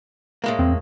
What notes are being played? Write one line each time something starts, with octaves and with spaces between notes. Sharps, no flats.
A2 G#3 A#3
E2 C4